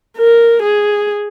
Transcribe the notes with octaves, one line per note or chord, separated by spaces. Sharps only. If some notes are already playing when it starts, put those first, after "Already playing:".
A#4
G#4